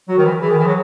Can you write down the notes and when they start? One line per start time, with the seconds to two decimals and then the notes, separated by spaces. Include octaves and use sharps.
0.09 F#3 F#4
0.18 D#3
0.25 E3
0.41 E3 G#4
0.50 D#3
0.59 E3
0.66 F#3